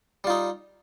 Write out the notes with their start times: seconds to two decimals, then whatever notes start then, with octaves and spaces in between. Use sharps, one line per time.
0.24 G3
0.27 F4
0.30 D#4